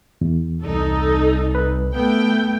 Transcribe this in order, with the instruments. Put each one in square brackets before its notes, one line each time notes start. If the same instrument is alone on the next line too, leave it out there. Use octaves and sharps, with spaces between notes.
[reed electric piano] E2
[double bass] C2 [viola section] D#4 A4
[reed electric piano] B4
[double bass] A3 B3 [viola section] G5